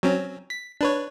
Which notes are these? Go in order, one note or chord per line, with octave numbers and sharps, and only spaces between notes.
F#3 C4 C#4
B6
D4 B4 C#5